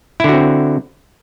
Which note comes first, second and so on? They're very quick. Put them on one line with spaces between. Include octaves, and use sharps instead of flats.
E4 D3 F#4 C4